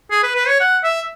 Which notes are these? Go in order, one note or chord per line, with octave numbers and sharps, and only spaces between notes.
G#4
B4
B4
C#5
F#5
E5